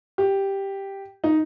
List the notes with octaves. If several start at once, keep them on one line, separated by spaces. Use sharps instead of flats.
G4
D#4